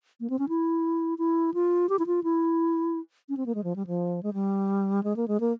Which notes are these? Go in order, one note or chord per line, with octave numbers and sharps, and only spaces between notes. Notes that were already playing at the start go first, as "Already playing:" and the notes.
A#3
C4
C#4
E4
E4
F4
G4
E4
F4
E4
C#4
C4
A#3
G#3
F3
G3
F3
G#3
G3
G#3
A#3
G#3
A#3